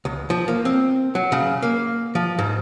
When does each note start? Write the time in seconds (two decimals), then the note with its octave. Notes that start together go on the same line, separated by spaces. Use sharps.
0.05 C#2
0.30 F3
0.48 A#3
0.65 C4
1.15 F#3
1.32 C#3
1.62 A#3
2.15 F3
2.38 G#2